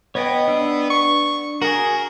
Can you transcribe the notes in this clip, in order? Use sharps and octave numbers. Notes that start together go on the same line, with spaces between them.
B3 C#5 D#5 G5
D4 E6
C#6
F#4 G#4 A#4